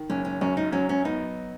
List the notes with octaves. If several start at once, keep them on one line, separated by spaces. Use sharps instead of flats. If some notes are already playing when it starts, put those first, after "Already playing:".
Already playing: D#3
F#1 C#4
C#4
F#2 C#4
D#4
F#3 C#4
C#4
B3 D#4